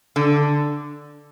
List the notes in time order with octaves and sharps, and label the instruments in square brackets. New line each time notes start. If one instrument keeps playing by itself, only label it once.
[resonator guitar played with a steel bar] D3